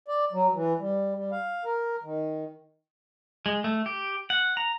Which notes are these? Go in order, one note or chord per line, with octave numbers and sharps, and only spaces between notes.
D5
F#3
E3
G3
G3
F5
A#4
D#3
G#3
A3
G4
F#5
A#5